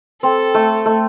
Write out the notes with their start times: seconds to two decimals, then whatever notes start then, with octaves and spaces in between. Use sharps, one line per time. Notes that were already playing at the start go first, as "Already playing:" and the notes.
0.23 C4 A4
0.54 A3
0.86 A3